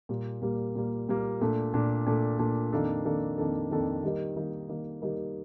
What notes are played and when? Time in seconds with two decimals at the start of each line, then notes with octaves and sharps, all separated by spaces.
0.09 A#2 G3 A#3
0.42 A#2 G3 A#3
0.75 A#2 G3 A#3
1.09 A#2 G3 A#3
1.41 A#2 A3 D4
1.74 A#2 A3 D4
2.07 A#2 A3 D4
2.39 A#2 A3 D4
2.72 F2 D#3 A#3 D4 A4
3.05 F2 D#3 A#3 D4 A4
3.38 F2 D#3 A#3 D4 A4
3.71 F2 D#3 A#3 D4 A4
4.03 D#3 G3 A#3 D#4 A#4
4.36 D#3 G3 A#3 D#4 A#4
4.69 D#3 G3 A#3 D#4 A#4
5.02 D#3 G3 A#3 D#4 A#4